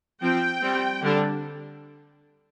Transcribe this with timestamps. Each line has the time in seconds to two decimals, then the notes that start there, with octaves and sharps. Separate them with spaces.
0.21 F3 C4 G5
0.62 G3 C4
1.02 D3 G3 D4